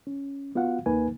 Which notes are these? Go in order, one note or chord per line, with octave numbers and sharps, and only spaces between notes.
C#4
B3 F4 F#4 F5 F#5
D#2 A#3 D#4 B4 G#5